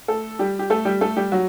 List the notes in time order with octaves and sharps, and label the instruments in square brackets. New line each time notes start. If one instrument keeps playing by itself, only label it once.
[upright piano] A3 A4
G3 G4
G4
A3 A4
G3 G4
A3 A4
G3 G4
F#3 F#4